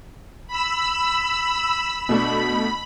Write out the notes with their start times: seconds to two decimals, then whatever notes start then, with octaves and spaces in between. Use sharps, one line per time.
0.47 B5 E6
2.09 B2 A3 D4 B5